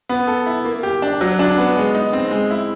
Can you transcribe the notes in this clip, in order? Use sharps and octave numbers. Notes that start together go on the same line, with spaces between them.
B3
A4
E4
A#3
G4
D4
F#3
D4
B3
G#3
D#4
C4
G#3
E4